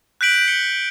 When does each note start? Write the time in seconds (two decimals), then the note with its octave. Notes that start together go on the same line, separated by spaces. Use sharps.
0.21 F#6 G6 B6 D7 F#7
0.48 C#7 F#7 G7